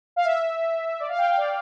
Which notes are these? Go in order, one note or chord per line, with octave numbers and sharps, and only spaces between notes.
F5
E5
D5
F5
G5
F5
D5